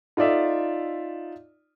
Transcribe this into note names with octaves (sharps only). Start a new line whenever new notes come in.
D#4 F4 A4 D5 E5